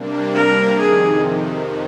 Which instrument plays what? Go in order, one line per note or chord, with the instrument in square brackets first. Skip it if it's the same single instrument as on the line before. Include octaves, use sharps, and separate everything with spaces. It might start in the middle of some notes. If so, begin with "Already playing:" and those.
Already playing: [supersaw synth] C3 G3 A#3 D4
[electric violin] A#4
[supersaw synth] F2 C3 D#3 [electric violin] G#4